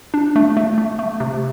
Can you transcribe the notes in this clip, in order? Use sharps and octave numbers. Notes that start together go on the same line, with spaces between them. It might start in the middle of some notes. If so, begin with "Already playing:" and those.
D4
A3
A3
A3
A3
C3